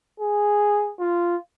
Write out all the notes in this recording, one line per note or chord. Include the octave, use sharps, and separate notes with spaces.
G#4
F4